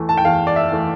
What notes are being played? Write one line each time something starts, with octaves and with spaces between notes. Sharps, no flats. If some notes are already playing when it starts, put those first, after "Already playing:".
Already playing: E2 E3 A3
A5
G5
E2 F5
D5
E5
E3 A3